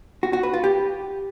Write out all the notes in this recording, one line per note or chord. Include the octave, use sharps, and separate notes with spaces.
F#4
F#4
B4
F4
G4